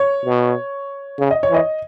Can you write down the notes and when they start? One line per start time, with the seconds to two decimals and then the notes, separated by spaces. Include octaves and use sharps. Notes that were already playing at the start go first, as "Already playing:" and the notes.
Already playing: C#5
0.25 B2
1.19 C#3
1.31 D#5
1.43 C#5
1.50 E3 D#5